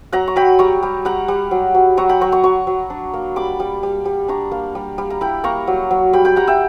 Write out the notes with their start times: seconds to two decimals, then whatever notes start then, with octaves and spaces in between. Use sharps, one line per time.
0.13 F#3 F#5 A#5
0.27 C#6
0.36 F#3 G5 B5
0.59 G3 A#5 C#6
0.83 G3
1.05 G3 F#5 A#5
1.28 G3
1.51 F#3
1.75 F#3
1.97 F#3 A#5 C#6
2.09 G5 B5
2.21 F#3 A#5 C#6
2.32 A#5 C#6
2.43 F#3 A#5 C#6
2.67 F#3
2.90 D4
3.14 A#3
3.36 G3 B5 D6
3.60 G3
3.83 G3
4.05 G3
4.28 D4 A#5 C#6
4.51 A#3
4.75 G3
4.98 G3
5.10 A#5
5.21 E4 G5 B5
5.44 A#3 A#5 C#6
5.67 F#3
5.91 F#3
6.13 G3 G5 B5
6.25 G5 B5
6.36 G3 F#5 A#5
6.47 E5 G5